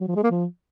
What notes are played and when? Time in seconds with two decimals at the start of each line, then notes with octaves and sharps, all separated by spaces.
0.01 F#3
0.08 F3
0.16 G#3
0.23 A#3
0.31 F3